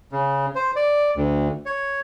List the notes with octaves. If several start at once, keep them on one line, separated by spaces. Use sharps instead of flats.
C#3
C5
D5
D2
C#5